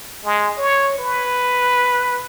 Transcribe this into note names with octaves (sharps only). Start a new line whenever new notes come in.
G#3
C#5
B4